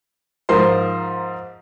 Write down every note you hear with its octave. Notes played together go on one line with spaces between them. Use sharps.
G#2 F3 F4 A#4 C5 C6